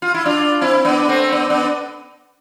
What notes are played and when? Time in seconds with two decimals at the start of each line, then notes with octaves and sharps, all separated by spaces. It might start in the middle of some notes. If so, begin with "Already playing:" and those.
0.02 F4
0.14 E4
0.25 D4 F4
0.61 C4 E4
0.85 B3 D4
1.08 A3 C4
1.32 B3 D4
1.50 B3 D4